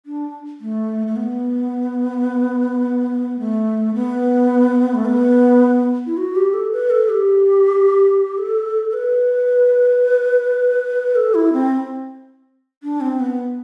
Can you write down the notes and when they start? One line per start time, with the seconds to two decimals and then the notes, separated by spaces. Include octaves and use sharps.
0.06 D4
0.61 A3
1.07 A3
1.16 B3
3.39 A3
3.94 B3
4.94 A3
5.05 B3
6.06 E4
6.17 F#4
6.35 G4
6.54 A4
6.72 B4
6.90 A4
7.09 G4
8.38 A4
8.90 A4
8.93 B4
11.15 A4
11.34 E4
11.53 C4
12.83 D4
13.01 C4
13.20 B3